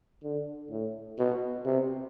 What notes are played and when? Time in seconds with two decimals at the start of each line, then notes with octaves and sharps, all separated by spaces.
0.23 D3
0.71 A2
1.18 B2
1.65 C3